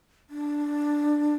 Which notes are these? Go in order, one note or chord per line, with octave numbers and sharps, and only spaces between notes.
D4